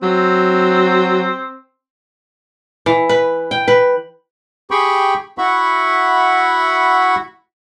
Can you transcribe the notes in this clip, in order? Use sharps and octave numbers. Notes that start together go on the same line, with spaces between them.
F#3 C4
E3
B4
G5
B4
G4 G#4 G5 B5 C#6
E4 F#4 E5 F#5 B5 C#6